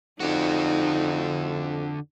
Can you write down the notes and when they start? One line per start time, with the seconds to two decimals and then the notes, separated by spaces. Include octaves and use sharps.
0.20 F2 D3 D4 D#4 F#4